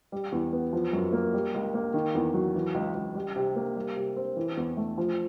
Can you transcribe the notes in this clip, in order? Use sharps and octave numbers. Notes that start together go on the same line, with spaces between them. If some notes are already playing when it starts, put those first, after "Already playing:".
G3
E2
B3
F3
F#2
A#3
G3
C#2
A#3
D#3
E2
F#3
E3
C#2
C#2
G3
C3
A#3
G3
C3
C4
E3
E2
A3
F3